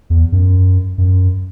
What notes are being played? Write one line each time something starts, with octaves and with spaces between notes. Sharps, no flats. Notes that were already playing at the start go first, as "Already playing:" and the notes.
E2
F#2
F#2